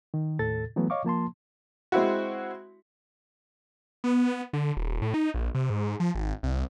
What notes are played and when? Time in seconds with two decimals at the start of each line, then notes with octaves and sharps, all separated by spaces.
0.14 D#3
0.39 D#2 A2 A4 A6
0.76 E3 F#3 A3 B3
0.90 C#5 D#5 F5 C#6 D6
1.05 F3 A#3 A5 C6
1.92 G#3 C4 E4 F#4
4.04 B3
4.53 D3
4.77 D#1
5.02 A2
5.14 D#4
5.34 A#1
5.55 C3
5.70 G#2
6.00 F3
6.15 G#1
6.43 C2